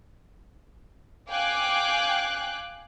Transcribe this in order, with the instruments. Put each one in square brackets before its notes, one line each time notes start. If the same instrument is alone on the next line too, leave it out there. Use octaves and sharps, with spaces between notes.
[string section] F5 G5 G#5 D6 F#6